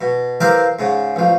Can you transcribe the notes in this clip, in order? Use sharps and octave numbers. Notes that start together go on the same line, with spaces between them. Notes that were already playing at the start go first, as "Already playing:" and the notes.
B2
E3 C4 G4 A#4 F5 D6
G#2 C#3
A1 F3